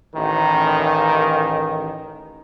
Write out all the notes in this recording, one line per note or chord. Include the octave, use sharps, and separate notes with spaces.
A1 D#3